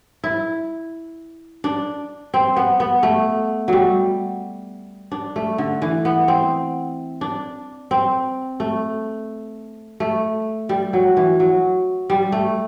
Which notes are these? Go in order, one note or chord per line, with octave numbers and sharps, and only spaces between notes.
E4
D4
C4
B3
B3
A3
F#3 G3
D4
A3
D3
E3
B3
C4
D4
C4
A3
A3
G3
F#3
E3
F#3
G3
A3